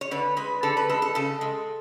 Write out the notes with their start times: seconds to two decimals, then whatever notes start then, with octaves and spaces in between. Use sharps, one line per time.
0.01 C#5
0.11 D3 B4
0.37 G#3 B4
0.63 D3 A4
0.77 B4
0.89 G#3 A4
1.02 A4
1.15 C#3 A4
1.41 G#3